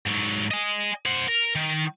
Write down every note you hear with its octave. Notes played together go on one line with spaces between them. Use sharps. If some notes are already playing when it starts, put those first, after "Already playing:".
G#2 F#3
D#5 G#5
C5 F#5
A#4
D#3